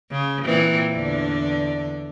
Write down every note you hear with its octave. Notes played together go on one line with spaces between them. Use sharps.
C#3
A#2 E3 C4
E2 D3 D4